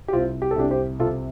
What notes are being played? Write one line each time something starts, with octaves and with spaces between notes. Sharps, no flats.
G4
C2 C4 F4
G4
A4
C2 D4 G4
G4 C5
C3 F4 A4